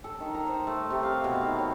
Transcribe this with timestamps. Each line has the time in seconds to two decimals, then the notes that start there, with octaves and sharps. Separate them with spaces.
0.04 A4
0.20 D#3
0.34 A#5
0.48 C5
0.67 A3
0.90 C3
1.03 F5
1.24 B2
1.41 D#3
1.58 C#5